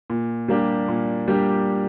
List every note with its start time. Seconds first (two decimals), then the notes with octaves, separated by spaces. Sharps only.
0.10 A#2
0.48 G3 A#3 D4 G4
0.88 A#2
1.28 G3 A#3 D4 G4